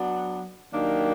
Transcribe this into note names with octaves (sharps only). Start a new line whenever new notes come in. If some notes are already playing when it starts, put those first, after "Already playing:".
Already playing: F#3 B3 D4
D#3 F#3 A#3 D4 G4